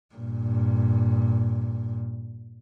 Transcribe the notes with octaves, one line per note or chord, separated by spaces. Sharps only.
G2 A#2